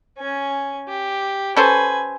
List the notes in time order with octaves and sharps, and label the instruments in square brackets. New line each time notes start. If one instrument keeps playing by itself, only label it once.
[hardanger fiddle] C#4 G#5
G4
[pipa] C#4 A4 C5 [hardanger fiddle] B4 G#5